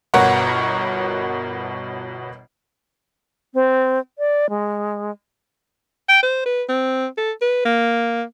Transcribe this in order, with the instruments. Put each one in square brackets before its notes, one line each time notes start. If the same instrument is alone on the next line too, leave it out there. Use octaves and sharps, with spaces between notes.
[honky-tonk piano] G1 B2 F#4 A#4 C#5 F#5
[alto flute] C4
D5
G#3
[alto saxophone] G5
C5
B4
C4
A4
B4
A#3